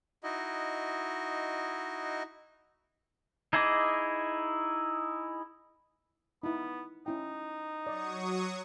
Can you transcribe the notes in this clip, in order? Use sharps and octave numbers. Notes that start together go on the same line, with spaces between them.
D#4 E4 F#4 D#5
D#4 E4 G#4 D#5 D6
B3 D#4 E4
C#4 D#4 E4 G5
F#3 D5 D#5 C#6 D#6